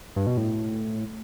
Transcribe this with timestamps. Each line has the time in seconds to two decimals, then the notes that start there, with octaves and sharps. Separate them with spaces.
0.16 G2
0.27 B2
0.37 A2